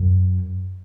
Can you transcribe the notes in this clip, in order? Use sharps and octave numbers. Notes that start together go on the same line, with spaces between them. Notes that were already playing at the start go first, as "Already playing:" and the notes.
Already playing: F#2